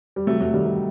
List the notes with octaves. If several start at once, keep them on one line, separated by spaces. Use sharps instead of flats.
G3
C3 F#3 A3
F#3 A3
D#3 G3
G3